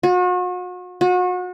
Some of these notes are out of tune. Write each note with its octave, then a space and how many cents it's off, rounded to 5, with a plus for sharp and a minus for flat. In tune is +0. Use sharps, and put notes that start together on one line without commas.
F#4 -40
F#4 -35